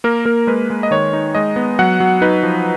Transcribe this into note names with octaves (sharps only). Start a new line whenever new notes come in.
A#3 A#4
A#3 A#4
G#3 B4
G#3
D#5
D#3 C#5
D#4
G#3 D#5
B3
F#3 F#5
F#3
D#4 B4
F3